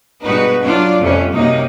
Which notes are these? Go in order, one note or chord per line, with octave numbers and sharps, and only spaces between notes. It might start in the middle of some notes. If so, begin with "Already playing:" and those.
G2 B2 G#3 D#4 F#4 B4
F#3 D4 F4 D5
F2 C3 G3 A3 C#4
F#2 C3 A#3 D#4